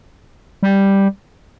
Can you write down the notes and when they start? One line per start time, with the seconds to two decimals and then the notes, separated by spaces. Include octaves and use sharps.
0.63 G3